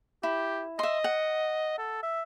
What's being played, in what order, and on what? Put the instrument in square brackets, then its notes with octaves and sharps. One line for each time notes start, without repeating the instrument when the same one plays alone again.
[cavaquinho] E4 [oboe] G4
[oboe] D#5 [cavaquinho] E5 C6
[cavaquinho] F#5
[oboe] A4
E5